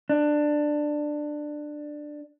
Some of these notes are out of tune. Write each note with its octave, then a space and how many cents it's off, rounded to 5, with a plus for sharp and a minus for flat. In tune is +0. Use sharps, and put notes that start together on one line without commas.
D4 +15